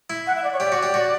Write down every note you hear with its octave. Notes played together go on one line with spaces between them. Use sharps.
E4
F#5
E5
D5
C#5
G4 D5
F#4
G4
F#4